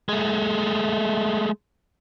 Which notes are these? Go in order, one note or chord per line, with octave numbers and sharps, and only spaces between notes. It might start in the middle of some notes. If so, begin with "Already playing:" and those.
G#3 A3